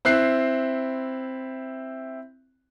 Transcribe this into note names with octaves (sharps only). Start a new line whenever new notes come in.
C4 E4 F#6 C7